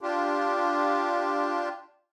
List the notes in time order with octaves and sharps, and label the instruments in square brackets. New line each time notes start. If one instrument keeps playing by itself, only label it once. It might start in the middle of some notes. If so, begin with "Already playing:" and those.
[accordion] D4 F4 G4